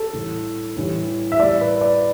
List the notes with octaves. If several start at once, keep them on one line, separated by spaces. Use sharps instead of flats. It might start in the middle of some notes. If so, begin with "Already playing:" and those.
Already playing: A4
A2 E3 G3
A2 E3 G3
E5
A2 G3 D5
B4
D5